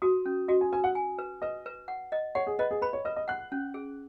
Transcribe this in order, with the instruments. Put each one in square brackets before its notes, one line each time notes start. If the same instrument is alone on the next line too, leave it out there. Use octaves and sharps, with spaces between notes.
[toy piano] F#4 [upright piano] D#6
[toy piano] C#4
[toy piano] F#4 [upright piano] D#5
[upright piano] G#5
[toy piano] B4 [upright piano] G#5
[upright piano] F#5
[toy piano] G#5
B4
[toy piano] B4 [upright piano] D#5
[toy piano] B4
F#5
D#5
[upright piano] C#5 [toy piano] F#5
[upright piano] G#4
[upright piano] B4 [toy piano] D#5
[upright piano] G#4
[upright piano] B4 [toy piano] B5
[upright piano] C#5
[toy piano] B4 [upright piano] D#5
[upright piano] D#5
[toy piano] F#5 [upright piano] F#6
[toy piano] C#4
G#4